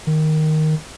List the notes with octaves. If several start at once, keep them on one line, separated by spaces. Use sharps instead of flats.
D#3